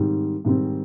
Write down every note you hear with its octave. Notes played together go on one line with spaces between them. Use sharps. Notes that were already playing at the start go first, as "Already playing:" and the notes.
Already playing: G#2 D#3 G3 C4
G#2 D#3 G3 C4